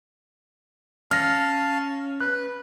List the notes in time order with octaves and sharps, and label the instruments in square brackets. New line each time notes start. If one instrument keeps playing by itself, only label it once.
[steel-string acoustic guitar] C#4 [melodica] F5 A5 [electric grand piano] F6 A#6
[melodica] B4 [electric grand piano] F#6